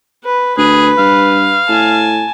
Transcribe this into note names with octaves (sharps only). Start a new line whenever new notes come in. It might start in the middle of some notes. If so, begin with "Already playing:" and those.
B4
D2 G#4 B4
G2 F5
A2 G#5 A5